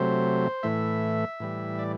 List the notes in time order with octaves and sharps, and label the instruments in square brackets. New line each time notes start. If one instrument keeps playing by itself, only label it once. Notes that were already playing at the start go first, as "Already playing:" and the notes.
Already playing: [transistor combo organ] C3 F#3 A3 C5
A2 E3 A3 E5
A2 E3 G3
D5